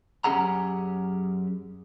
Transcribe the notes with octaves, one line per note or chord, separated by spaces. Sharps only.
F#2 C#4 G4 G#4 F#5 A#5